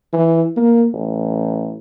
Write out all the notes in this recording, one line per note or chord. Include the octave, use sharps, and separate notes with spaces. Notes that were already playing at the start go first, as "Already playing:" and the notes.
E3
A#3
A1